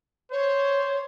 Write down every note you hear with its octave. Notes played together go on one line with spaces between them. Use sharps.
C5 C#5